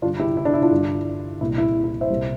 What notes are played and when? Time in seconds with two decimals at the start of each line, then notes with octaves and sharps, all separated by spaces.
0.02 G2 D3 G3 D4 F4
0.20 E4 G4
0.37 E4
0.45 D4
0.54 E4
0.62 D4 F4
0.71 G2 D3 G3
1.41 C2 A#2 G3 E4
1.58 E4
1.84 E4
2.01 C5 E5
2.10 C2 A#2 G3